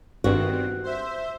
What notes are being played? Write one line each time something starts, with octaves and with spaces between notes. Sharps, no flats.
G1 G2 D#3 C4 F#4
C5 E5